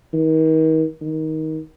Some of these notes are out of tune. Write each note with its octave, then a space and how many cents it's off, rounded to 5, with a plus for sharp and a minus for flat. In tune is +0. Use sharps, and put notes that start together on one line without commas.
D#3 +35
D#3 +20